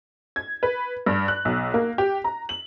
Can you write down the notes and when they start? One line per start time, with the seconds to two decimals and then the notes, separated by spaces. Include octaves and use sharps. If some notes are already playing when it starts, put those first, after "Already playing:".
0.36 G#6
0.63 B4
1.06 G2
1.28 F#6
1.45 B1
1.74 A#3
1.98 G4
2.24 A#5
2.49 F#7